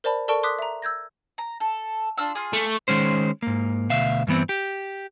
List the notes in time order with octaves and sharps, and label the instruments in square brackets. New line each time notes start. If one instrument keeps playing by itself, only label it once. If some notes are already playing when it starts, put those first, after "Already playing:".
[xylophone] A#4 C5 D5 A5 B5
A4 A#4 D5 A5 C#6 D7
C6 D6 D#6 F#6 B6
E5 A#5
E6 G6 G#6 A#6
[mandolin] A#5
A4
D4 F4 E6
F4 G#4
[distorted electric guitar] A3
[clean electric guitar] D#3 G#3 C#4 C5
G#2 A#3
D2 B2 E5 F5
G2 E3 B3 C4
G4